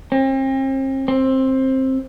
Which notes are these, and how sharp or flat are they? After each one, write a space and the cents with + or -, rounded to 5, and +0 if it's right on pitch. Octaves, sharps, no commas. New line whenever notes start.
C4 +40
C4 +15